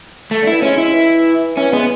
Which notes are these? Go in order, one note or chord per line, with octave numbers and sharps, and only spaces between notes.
A3
D3
E3 E4
G#3 C#4
E4
E3
E3 C#4
G#3 B3